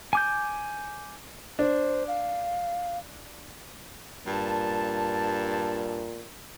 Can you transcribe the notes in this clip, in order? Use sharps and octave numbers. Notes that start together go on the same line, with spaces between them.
G#5 D6 G6
D4 C5
F5
G2 A#2 A5